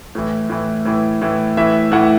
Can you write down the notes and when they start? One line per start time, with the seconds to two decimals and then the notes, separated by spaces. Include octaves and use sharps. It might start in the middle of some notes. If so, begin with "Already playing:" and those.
0.15 A2 E3
0.50 A2 E3
0.85 A2 E3
1.21 A2 E3
1.57 A2 E3 E5
1.92 A2 E3 F#5